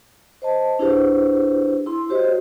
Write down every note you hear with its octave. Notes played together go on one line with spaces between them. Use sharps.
C5 D#5 A5
D4 E4 G4 G#4 B4 C5
E4 C6
F#4 G4 C5 C#5 D#5